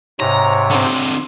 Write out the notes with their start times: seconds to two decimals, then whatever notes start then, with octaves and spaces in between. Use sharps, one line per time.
0.20 G#2 C3 C#5 A#5
0.71 D3 C4